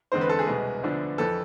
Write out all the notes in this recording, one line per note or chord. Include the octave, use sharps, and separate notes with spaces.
E2 D3 G#3 C4 C5
B4
A4
G#4
C2 B2 G#3 B3
D2 D3 F3 B3 D4
F2 E3 A4